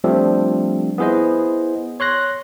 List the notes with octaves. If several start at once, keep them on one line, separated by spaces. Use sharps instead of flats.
F3 G3 A3 C4 D4
B3 E4 G#4 C5 D#5
C#5 C6 F#6 A#6